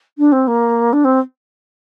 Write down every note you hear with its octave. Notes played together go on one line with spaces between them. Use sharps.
D4
C4
A#3
D4
C4